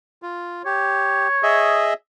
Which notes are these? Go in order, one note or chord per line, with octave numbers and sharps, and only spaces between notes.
F4
G4 C#5
G#4 D#5 E5